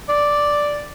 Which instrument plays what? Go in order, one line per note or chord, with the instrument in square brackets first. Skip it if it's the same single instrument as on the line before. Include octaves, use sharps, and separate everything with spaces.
[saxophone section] D5